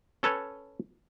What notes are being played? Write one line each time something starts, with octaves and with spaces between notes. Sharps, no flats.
C#4 A4 B4 C#5